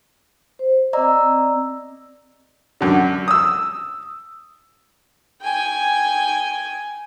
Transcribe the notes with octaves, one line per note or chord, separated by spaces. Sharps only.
C5
C4 D5 D#5 A#5 E6
F#2 D3
D#6 E6
G5 G#5